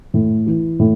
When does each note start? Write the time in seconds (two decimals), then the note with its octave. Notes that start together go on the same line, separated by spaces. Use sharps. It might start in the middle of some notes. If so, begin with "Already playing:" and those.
0.14 A2
0.46 E3
0.79 A2